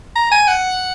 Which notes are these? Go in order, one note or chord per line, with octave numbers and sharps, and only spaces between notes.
A#5
G#5
F#5